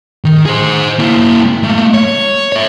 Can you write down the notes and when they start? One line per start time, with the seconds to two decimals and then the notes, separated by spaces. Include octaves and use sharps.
0.25 D#3
0.46 G#4 C5
0.99 A#3 E4
1.63 A3 A#3
1.94 C#5
2.52 C#5 E5